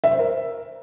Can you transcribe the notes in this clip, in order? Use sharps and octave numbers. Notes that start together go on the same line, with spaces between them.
E5
C5
A#4